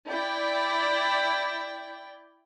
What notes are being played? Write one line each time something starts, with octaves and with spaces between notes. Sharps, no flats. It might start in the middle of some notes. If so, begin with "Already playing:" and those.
E4 D5 G5